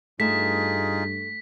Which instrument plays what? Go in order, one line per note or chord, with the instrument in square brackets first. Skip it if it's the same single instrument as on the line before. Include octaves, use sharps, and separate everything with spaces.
[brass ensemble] G2 [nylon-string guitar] A3 [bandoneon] D#4 F4 G#4 [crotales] B6